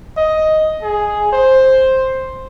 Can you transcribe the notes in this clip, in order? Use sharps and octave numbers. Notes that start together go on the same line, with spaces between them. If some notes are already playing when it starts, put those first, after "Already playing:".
D#5
G#4
C5